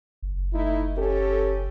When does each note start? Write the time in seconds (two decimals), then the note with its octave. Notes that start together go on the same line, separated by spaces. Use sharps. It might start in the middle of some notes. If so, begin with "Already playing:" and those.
0.22 F#1
0.53 A3 D#4 E4
0.98 C#4 G4 A4